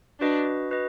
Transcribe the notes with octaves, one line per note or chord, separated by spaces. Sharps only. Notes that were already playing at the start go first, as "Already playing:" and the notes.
D4 F#4 B4 D#5
F#4 B4 D#5